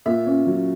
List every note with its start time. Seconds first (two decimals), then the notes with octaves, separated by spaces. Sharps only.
0.06 A#2 E5
0.26 C#4
0.47 F#3